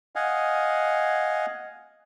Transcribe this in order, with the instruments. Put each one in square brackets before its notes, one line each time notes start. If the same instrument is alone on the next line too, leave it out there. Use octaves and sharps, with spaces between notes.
[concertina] D#5 F5 F#5 G#5